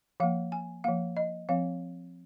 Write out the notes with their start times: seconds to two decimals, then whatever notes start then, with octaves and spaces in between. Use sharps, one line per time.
0.20 F3 A#3 F5
0.52 G#5
0.84 F3 A#3 F5
1.17 D#5
1.49 F3 C4 F5